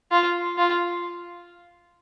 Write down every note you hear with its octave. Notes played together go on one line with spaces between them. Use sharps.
F4
F4